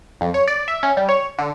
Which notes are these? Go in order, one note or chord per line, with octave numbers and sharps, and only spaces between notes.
F2
C#5
D5
E5
C#4
G3
C#5
D3